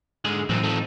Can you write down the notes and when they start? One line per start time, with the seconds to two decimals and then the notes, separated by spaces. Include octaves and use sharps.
0.25 G#2 D3 G#3 G#4
0.49 C2 F#2 A2 E3 F#3 C4 C#4 D#4
0.64 F3 A3